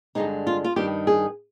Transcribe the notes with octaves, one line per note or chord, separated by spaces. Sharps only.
G2 D3 G#3 D#4
F4
F4
G2 D#3 G3 G4
G#4